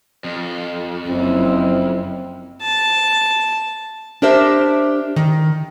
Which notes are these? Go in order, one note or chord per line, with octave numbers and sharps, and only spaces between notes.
F2
F#1 C4 E4
A5
D4 G4 A#4 C5 E5
D#3